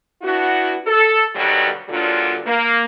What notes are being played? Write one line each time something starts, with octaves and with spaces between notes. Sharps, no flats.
B3 D4 E4 F#4
A4
G2 B2 D3 D#3 F#3 G3
G2 A#2 D3 F#3 D4 F4
A#3